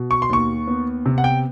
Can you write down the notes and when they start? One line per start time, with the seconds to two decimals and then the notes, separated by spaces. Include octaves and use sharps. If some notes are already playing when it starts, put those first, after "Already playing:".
Already playing: B2
0.11 C#6
0.22 C6
0.29 D#2 C#6
0.67 B3
1.06 C3
1.18 F#5
1.24 G5